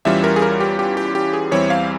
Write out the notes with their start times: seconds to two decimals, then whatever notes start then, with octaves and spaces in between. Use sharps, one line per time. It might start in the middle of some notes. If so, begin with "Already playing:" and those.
0.05 E2 E3 G3 C#4 F4 E5
0.24 A#4
0.36 G#4
0.42 A#4
0.60 G4
0.79 G4
0.97 G4
1.15 G4
1.33 G#4
1.51 E2 E3 G3 C4 E4 C#5
1.70 F5